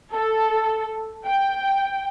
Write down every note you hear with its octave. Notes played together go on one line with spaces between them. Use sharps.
A4
G5